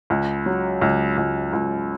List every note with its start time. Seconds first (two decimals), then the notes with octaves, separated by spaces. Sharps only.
0.10 C#2
0.46 F#3
0.81 C#2
1.17 C#2
1.53 C#2